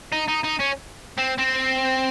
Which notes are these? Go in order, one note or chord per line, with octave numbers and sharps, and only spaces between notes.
D#4
D#4
D#4
C#4
C4
C4